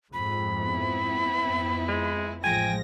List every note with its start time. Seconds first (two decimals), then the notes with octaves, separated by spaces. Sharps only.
0.13 F2 G#2 B5
0.58 B3 C4 E4
1.43 F2
1.89 G#3
2.44 A1 F3 G#3 G5 G#5 A#6